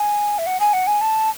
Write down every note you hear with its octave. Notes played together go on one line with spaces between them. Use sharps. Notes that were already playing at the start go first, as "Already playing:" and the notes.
Already playing: G#5
E5
F#5
G#5
F#5
G#5
A5